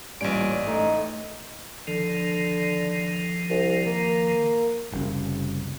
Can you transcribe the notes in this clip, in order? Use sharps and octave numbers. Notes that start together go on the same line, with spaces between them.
A1 G2 A#2 G3 C#4 C#5 D7
A3 D#4
D3 D#3 F3
C2
A#3
F#1 C2 F#2 C#3